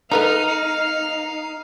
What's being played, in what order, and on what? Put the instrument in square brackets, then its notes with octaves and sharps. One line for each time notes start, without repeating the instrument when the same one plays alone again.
[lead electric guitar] D#4 [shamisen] A4 B4 A#5 [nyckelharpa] F5